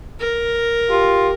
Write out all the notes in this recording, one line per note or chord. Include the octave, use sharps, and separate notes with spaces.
A#4
F4 G4